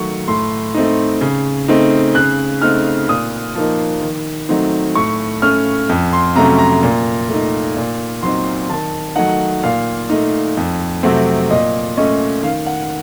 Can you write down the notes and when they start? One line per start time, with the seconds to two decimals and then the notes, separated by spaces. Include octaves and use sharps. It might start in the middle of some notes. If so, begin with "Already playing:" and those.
Already playing: D#3 F#3 A3 C#6
0.28 A2 C6
0.75 A3 C4 D#4
1.21 C#3
1.68 A3 C4 D#4
2.15 C#3 F#6
2.62 A3 C4 D#4 F6
3.09 A#2 D#6
3.55 F3 A#3 D#4
4.02 D#3
4.49 F#3 A3 C4 D#4
4.95 A2 C#6
5.42 A3 C#4 F6
5.89 F2
6.13 C6
6.35 C3 F#3 A3 C#4 A#5
6.59 A#5
6.83 A#2
7.29 A3 D#4
7.77 A#2
8.23 F#3 C4 D#4 C6
8.70 D#3 A5
9.16 F#3 A3 D#4 F#5
9.63 A#2 F5
10.10 A3 D#4
10.57 F2
11.03 C3 F#3 A3 C4
11.51 A#2 D#5
11.97 A3 C#4 D#5
12.43 D#3 F5
12.66 F#5